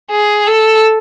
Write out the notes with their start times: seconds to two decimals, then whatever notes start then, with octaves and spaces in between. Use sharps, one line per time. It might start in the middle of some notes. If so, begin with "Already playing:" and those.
0.11 G#4
0.47 A4